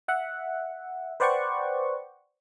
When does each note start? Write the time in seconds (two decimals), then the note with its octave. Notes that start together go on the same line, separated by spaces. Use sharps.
0.08 E5 F#5
1.20 B4 C5 D5 F#5 G5 C#6